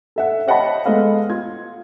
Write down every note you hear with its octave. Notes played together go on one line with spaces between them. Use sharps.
A4 E5 F#5
C#5 D#5 F#5 G5 A5 B5
G#3 B3 A4 D#5 F5
F4 G#6